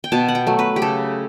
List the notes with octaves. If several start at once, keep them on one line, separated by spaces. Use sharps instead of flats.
G5
B2 A5
F#5
G5
F#3 A3
B4
G4
C#3 A4